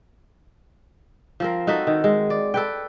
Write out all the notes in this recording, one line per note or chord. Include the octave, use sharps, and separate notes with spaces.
F3 C4 A#4
D#4 F#4 A4 E5
D#3
G#3
D5
A4 B4 G5